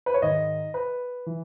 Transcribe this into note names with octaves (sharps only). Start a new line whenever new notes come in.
B4
C#5
G#2 D#3 D#5
B4
E3